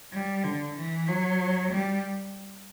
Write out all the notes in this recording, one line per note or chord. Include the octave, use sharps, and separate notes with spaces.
G3
D3
E3
F#3
G3